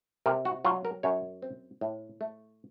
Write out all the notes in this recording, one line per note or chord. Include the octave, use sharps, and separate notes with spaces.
C3 A#4
F#4
F#3 F4
A#4
F#2 C#5
C4
A2
A3